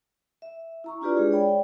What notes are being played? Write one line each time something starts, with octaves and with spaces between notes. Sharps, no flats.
E5
E4 A#5 C#6
D4 E4 F4 G4 B4 D5
G#3 D4 G#4
C#5 D5 G5 B5